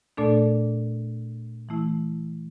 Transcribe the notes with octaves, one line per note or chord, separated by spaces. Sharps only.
A#2 A3 D4 A4 D5
E3 A3 E4